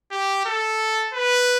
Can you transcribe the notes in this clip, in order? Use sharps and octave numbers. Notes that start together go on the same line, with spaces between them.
G4
A4
B4